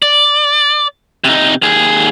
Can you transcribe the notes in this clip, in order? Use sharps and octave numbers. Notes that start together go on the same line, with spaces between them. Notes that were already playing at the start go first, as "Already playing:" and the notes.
D5
C3 D#4
D#2 G#4